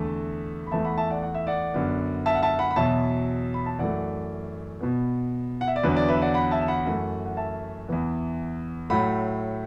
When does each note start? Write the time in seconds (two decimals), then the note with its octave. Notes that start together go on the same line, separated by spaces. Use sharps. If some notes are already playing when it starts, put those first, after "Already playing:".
Already playing: E2 D3 A3 E5 A5
0.67 B5
0.71 E2 E3 A3 E5 A5
0.84 F#5 B5
0.98 E5 A5
1.10 D5 F#5
1.23 F#5
1.35 E5
1.47 D5 F#5
1.74 F#2 D3 B3
2.26 E5 A5
2.35 F#5
2.42 E5 A5
2.59 F#5 B5
2.71 B5
2.76 E2 B2 F#3 E5 A5
3.54 B5
3.66 A5
3.79 F#2 E3 A3 D5 F#5
4.81 B2 B3
5.61 F#5
5.68 E5
5.76 D5
5.83 E2 D3 F#3 B3 B4
5.96 D5
6.09 B4 E5
6.22 D5 F#5
6.34 F#5 B5
6.51 E5 A5
6.62 A5
6.68 F#5 B5
6.86 F#2 E3 A3
7.26 F#5
7.37 E5 A5
7.88 E2 E3 B3
8.90 A2 F#3 A3 F#5 B5